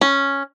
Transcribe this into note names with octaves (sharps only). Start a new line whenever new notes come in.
C#4